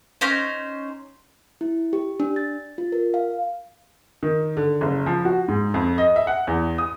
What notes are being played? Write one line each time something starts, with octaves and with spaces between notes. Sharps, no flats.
C#4 D#4 C5
E4
G4
D4
A6
F4
A#4
F5
D#3
D3
F#1
F3
F#4
G#2
F2
D#5
E5
F#5
E2
D#6